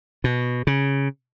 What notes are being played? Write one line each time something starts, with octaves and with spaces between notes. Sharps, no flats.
B2
C#3